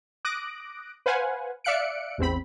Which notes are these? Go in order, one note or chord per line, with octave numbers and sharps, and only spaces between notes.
D6 D#6 F#6 A#6 D7
B4 C5 F5 F#5 G#5
D5 E5 F5 F#6 C#7 D7
A1 E2 C4 B5